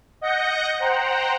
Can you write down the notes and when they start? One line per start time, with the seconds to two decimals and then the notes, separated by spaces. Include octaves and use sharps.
0.21 D#5 F#5 G6 A#6 C#7
0.80 C5 F#5 G5 A#5